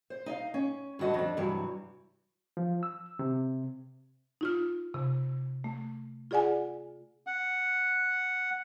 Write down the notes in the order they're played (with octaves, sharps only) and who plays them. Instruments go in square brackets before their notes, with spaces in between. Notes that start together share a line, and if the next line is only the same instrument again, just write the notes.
[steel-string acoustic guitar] C5
D#4 D#5 F5
C#4
G2 D3 F#4 D#5 A5
F2 D4
G2 C3 E3 F#3
[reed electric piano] F3
E6
C3
[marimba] D#4 F4 F6
C3
A3
F4 G#4 D5 F#5 G#5
[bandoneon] F#5